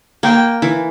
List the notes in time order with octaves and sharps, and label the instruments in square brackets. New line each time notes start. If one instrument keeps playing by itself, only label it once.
[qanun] A#3 [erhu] G5
[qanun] E3